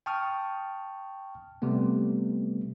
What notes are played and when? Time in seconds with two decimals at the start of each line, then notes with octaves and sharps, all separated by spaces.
0.06 G5 A5 C#6 D#6 F6
1.62 C3 G3 A3 B3